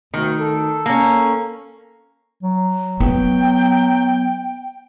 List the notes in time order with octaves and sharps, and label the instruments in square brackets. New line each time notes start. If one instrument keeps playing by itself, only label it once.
[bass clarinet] D2 [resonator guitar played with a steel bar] D#3
[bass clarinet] A4
[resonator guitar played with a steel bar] A#3 C#4
[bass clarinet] F#3
[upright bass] B3 [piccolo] G5